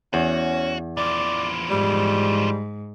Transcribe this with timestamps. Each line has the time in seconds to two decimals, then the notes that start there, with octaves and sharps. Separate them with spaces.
0.14 E2 C#4 F#4
0.97 E3 F3 D5
1.70 G#2 G3